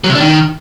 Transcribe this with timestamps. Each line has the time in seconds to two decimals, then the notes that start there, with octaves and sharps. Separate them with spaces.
0.04 F#3
0.10 C3
0.15 D4
0.20 D#3